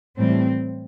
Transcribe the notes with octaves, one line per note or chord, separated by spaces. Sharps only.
A2 E3 G3 C4